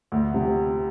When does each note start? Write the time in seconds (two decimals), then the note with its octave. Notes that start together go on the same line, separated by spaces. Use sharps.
0.12 D2
0.34 C3